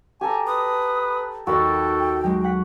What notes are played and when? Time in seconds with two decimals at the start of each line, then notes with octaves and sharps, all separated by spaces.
0.21 G4 A4 G#5 A#5
0.47 B4 D#6
1.47 D#2 F#4 A4 D#5 G5 B5 A6
2.24 F#3 G#3
2.44 F#5 B6